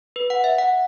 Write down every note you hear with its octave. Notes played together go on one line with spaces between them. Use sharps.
B4
F#5
E5
F#5